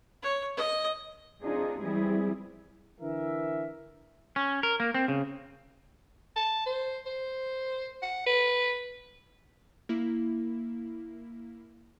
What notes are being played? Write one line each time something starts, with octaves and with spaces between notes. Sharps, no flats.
C#5
D#5
C4 D4 D#4 F4 G#4
E3 G3 G#3 C4 E4 G#4
D3 E3 A#4 E5
C#4
A#4
A#3
C4
C#3
A5
C5
C5
F#5
B4
A#3 E4